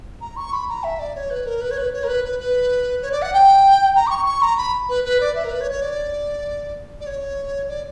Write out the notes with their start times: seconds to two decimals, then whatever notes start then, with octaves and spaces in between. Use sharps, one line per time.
0.21 A#5
0.37 C#6
0.53 B5
0.69 A#5
0.84 E5
0.99 D5
1.15 C#5
1.30 B4
1.46 A#4
1.61 B4
1.71 C#5
1.78 B4
1.93 C#5
2.04 A#4
2.08 B4
2.25 B4
2.39 B4
3.02 C#5
3.12 D5
3.22 F#5
3.34 G5
3.96 A#5
4.07 D6
4.10 C#6
4.26 C#6
4.42 A#5
4.58 B5
4.89 B4
5.04 B4
5.20 D5
5.35 E5
5.44 A#4
5.50 B4
5.61 C#5
5.71 C#5
5.82 D5
7.00 D5
7.06 C#5
7.68 D5